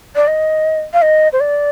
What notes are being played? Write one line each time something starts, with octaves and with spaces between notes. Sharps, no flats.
D5
D#5
F5
D#5
C5
D5